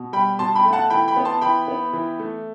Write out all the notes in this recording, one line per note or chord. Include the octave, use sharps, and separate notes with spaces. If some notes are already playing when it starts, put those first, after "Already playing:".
Already playing: B2
G3 G5 B5
B2 A5 C6
G5 B5
A3
F#5 A5
E3 G5 B5
G5 B5
B3
A5 C6
E3 G5 B5
B3
E3
A3